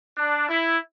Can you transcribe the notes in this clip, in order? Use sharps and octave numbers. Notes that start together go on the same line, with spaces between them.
D4
E4